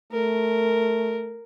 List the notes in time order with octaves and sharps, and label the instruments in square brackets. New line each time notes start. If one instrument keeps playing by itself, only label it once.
[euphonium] A3 [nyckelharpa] A#4